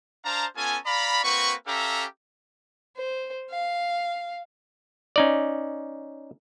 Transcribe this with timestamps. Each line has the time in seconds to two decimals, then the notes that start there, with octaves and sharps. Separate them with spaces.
0.25 D4 C5 F5 A5 A#5
0.57 B3 C#4 F4 A4 G#5
0.86 D5 F5 A#5 B5
1.24 A#3 C4 F#4 B4 C#6
1.67 C#4 G4 A4 E5 F5 A#5
2.96 C5
3.50 F5
5.16 C#4 D#4 D5